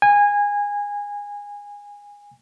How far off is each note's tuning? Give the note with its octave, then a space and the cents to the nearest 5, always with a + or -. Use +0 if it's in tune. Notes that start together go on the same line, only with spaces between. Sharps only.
G#5 -20